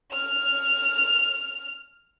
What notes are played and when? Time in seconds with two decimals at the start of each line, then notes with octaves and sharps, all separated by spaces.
0.13 F6 F7